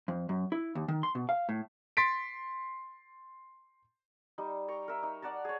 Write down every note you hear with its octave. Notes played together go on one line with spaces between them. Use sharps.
F2
F#2
E4
D#2
D#3
C6
B2
F5
A2
C6 A6 B6 D7
G3 D#4
G5 A#5 C#6
A#4 E5
D#4
D5 F#5 A5 A#5
G#4 C#5